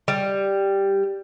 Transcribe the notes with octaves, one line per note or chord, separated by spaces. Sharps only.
G3